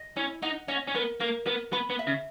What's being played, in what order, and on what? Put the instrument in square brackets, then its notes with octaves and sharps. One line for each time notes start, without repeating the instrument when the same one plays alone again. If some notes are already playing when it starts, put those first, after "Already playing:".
Already playing: [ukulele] D#5
[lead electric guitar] C#4 [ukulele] E4
[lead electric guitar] D#4 [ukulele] F#5
[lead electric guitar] C#4 [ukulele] D#5
[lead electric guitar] C#4
[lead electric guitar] B3 [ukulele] A#4
[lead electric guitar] A#3 [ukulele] A#4
[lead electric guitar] B3 [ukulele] A#4
[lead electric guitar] B3 [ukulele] B5
[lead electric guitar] B3
[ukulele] E5
[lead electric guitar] C#3